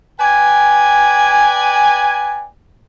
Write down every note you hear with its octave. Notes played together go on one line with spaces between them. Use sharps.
B4 D5 G5 G#5